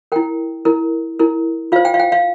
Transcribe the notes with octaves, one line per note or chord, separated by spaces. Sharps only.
E4 A#4 G5
E4 A#4
E4 A#4
F4 C5 F5
G5
F5
G5
F5